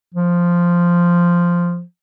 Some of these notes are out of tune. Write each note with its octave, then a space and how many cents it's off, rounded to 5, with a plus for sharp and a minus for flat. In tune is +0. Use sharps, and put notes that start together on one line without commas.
F3 -5